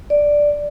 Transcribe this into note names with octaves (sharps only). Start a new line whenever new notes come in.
D5